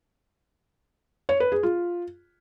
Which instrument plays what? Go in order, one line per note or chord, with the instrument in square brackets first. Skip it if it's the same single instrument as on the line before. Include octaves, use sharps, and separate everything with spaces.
[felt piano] C#5
B4
G#4
F4